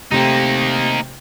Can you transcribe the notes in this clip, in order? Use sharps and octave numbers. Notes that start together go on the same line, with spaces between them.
C3 A3 A#3 C4 D#4